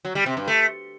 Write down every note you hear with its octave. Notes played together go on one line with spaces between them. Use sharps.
F#3
G3
C3
G2
A3